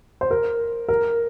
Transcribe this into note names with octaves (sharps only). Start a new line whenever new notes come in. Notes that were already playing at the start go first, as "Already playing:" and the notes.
C5
A#4
A#4